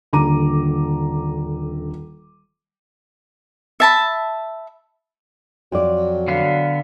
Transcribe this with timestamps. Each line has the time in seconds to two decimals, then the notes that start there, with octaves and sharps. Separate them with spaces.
0.13 D#1 D3 A#5 D6 D#7
3.80 E5 A5 B5
5.72 F2 F#3 D5
6.28 D3 B3 F5